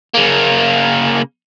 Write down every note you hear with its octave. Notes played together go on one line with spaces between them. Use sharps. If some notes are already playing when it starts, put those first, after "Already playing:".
C#3 A#3